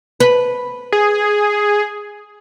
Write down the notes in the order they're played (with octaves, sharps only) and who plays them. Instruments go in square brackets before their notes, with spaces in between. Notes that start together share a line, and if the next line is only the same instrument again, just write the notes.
[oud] B4
[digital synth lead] G#4